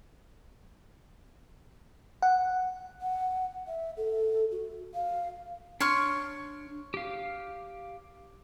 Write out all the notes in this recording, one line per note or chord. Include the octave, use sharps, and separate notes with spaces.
F#5
F#5
E5
A4
F#4
F5
D4 C#5 C6 C#6 F6
G4 F5